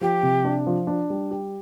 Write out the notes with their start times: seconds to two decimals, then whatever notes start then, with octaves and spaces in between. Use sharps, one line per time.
0.01 F3 G4
0.23 C3
0.44 D4
0.67 F3
0.87 D4
1.10 G3
1.31 G4